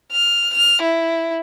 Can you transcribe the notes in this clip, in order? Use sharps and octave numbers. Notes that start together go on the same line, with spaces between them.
F6
F6
E4